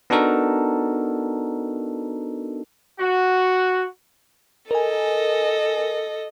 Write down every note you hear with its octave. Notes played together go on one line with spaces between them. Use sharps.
B3 D4 D#4 F#4 A4 A#4
F#4
A4 A#4 D#5 G#5